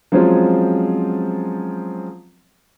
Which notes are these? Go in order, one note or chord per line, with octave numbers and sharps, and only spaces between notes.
F3 F#3 G#3 C4 C#4 F4